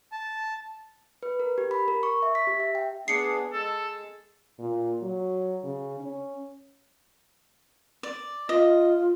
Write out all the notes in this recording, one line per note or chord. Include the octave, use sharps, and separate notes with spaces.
A5
B4
A#4
G4
B5
A#4
C#6
E5
B6
G4
E5
G5
B3 D4 G#4 C7 C#7
G#3 A4
A#2
F#3
C#3
C#4
D5
F4 D#5